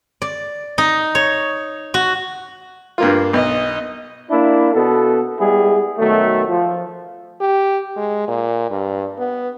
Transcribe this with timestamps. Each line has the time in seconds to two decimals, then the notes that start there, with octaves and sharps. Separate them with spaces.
0.22 D5
0.78 D#4
1.15 C#5
1.94 F#4
2.98 G2 A#3 F4
3.33 B1 D#5
4.30 A#3 D4 E4
4.74 B2 B3 A4
5.39 G3 G#3 B3 E4 G#4
5.98 B2 D#3 F#3 A3
6.48 F3
7.41 G4
7.97 G#3
8.28 A#2
8.71 G2
9.18 B3